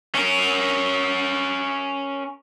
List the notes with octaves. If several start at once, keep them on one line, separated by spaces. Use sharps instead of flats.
C#4 A#4